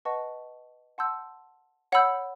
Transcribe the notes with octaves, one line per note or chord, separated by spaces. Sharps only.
B4 D#5 F#5 A5 C#6
F#5 A5 C6 E6 G6
C#5 F#5 B5 E6 G6